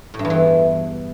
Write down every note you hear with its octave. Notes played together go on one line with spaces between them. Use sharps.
A2
G2
E2
E3